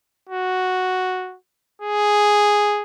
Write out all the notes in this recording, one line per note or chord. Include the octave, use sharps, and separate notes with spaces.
F#4
G#4